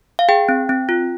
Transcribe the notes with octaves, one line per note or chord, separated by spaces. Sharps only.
F5
G#4 G5
C4
C4
F4